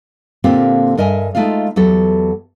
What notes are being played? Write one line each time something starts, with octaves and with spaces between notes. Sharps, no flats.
A#2 D3 A#3 C4 F4 G4
G2 A#4 D#5 E5 G#5
G#3 A3 D#4 F4 F5
E2 F#3 G4 A4